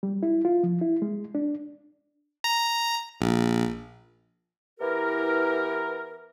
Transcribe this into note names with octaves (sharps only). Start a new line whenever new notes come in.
G3
E4
F4
F3
E4
G#3
D4
A#5
A#1
E3 B3 E4 G4 A#4